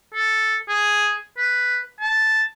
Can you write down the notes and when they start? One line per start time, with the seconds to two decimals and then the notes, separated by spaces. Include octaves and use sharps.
0.14 A4
0.69 G#4
1.38 B4
2.01 A5